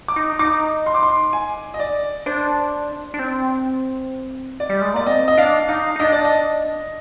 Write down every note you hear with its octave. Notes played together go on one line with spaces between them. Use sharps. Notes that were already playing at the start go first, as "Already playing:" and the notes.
D6
D#4
D#4 D6
C6
D6
C6
G#5
D#5
D5
D4 C5
D4
C4
D5
G3
G#3
A#3 D5
C4 D#5
D#5
D4 F5
D#4 F5
D#4
D4 D#5
D5
D#5